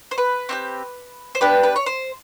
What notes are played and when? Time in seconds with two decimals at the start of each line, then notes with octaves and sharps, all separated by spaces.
0.11 C5
0.18 B4
0.49 C4 D#4 G4
1.35 C5
1.41 B3 D4 G4 B4
1.63 B4
1.76 C#5
1.86 C5